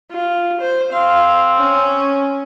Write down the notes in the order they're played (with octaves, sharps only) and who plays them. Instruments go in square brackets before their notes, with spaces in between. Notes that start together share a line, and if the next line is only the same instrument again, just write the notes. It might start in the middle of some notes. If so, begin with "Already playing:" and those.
[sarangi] F4
C5
[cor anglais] C4 [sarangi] F5
[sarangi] C#4